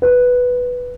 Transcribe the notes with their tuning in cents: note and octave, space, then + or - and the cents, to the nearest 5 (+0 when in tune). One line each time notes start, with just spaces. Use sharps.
B4 +0